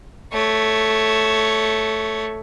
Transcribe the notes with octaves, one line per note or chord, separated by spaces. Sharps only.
A3 C#5